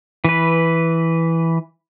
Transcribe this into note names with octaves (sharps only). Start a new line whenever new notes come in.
E3 B4